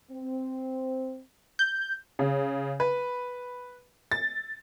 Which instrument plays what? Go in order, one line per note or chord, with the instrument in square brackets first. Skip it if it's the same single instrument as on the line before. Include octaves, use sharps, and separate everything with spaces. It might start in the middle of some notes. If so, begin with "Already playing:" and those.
[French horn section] C4
[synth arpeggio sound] G6
[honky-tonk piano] C#3
B4
A6